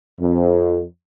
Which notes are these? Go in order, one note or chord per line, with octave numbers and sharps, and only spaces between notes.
F2